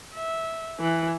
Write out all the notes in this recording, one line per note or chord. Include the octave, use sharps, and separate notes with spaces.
E5
E3